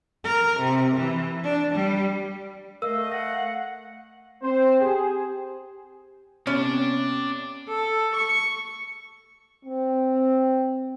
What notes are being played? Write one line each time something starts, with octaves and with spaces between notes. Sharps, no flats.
A#4
C3
E3
D4
G3
A3 A#4 D#5 F5 E6
F#5 A#6
C4 C5
G4 G#4
C3 B3 C#4 C#5 D5 A5
A4
C#6
C4